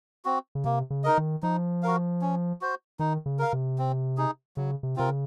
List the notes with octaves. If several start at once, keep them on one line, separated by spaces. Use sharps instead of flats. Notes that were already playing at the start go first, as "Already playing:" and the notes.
C4 F#4
C#3
C3 A#3
C#3
D#4 A#4 D#5
D#3
F3 D#4
F#4 A#4 F5
C#4
F#4 C5
D#3 D#4
C#3
A#4 F5
C3
C4
D#4 G#4
C#3 F#3
C3
C3 C4 F4 A#4
C#3